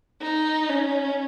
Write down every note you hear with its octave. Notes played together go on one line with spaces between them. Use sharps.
D#4
C#4